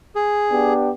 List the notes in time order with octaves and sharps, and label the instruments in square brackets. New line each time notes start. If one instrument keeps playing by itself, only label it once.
[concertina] G#4
[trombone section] B3 D4 G4